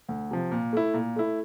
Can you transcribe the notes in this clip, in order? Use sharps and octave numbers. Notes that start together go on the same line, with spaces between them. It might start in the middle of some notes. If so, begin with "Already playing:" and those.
D2
C3 F3
A#2
A3 E4
A#2
A3 E4